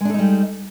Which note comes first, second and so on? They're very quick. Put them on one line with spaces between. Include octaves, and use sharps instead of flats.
G#3 D4 A4 D#4 G3